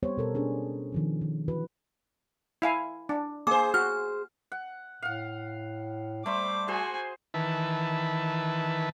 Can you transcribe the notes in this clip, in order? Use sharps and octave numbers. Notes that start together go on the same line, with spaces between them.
G3 B3 C4 G4 C5 C#5
B2 A4 A#4
C#4 D4 G#4
D#3 F3 C4
D#3
D#3 E3 F#4 B4
E4 F5 G#5
D4
A#3 G#4 C5 D6
F#4 F6
F#5
A2 F5 F#5
G3 A3 C5 B5 D6
F#4 G#4 C5 G#5
D#3 E3 B4 E5 A5